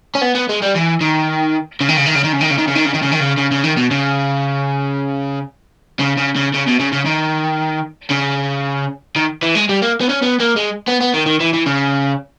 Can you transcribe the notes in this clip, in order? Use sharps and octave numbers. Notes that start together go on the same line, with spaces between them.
C#4
B3
B3
G#3
G3
E3
D#3
C#3
D#3
C#3
D#3
C#3
D#3
C#3
D#3
C#3
D#3
C#3
D#3
C#3
D#3
C#3
D#3
C#3
C#3
C#3
D#3
B2
C#3
C#3
C#3
C#3
C#3
B2
C#3
C#3
D#3
C#3
D#3
E3
G#3
G3
A#3
B3
C#4
B3
A#3
G#3
B3
B3
D#3
D#3
E3
E3
C#3